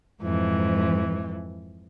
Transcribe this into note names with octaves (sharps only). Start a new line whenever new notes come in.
F2 G#2 E3